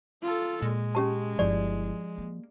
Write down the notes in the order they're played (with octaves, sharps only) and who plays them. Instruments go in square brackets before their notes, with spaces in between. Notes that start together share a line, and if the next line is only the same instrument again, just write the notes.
[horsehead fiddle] F4 A4
[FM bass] A#2 [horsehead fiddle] G#3
[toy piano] C#4 G4 A5
[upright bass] G1 E4 [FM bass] F3 [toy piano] D5
[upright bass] A#3